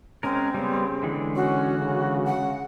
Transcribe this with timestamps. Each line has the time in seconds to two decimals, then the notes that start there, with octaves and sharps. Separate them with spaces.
0.23 G#3 C4 C#4 A#4
0.54 C#3 G3 B3
1.03 D3 E3 G#3
1.35 C#4 F#4
1.79 C#3
2.26 F#5